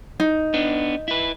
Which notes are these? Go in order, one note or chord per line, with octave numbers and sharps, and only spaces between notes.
D#4
B3 D4
E4 B4